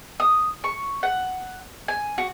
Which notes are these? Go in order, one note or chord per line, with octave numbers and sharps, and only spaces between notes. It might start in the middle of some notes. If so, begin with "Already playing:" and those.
D#6
C#6
F#5
G#5
F#4